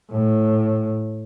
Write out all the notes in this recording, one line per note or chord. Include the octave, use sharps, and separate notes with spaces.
A2